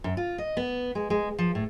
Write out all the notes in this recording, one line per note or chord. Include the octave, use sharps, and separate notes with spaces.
F#2
F4
D#5
B3
G#3
G#3
F3
A2